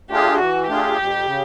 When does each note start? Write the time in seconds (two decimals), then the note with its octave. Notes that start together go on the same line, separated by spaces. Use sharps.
0.10 A3 D4 F4 G4 G#4
0.39 E3 F#4
0.68 A3 D4 F4 G4 G#4
0.97 F2
1.26 C#3